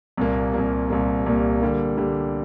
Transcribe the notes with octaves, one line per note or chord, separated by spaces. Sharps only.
C2 A#2 A#3
C2 A#2 A#3
C2 A#2 A#3
C2 A#2 A#3
D3 G3 A#3
D3 G3 A#3